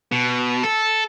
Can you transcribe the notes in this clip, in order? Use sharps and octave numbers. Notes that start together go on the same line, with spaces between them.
B2
A4